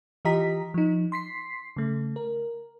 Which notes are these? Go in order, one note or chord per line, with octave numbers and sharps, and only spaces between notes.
E3 F4 G4 D#5 A#5 B6
F3 D#4
C6 B6 C7
C#3 A3
A#4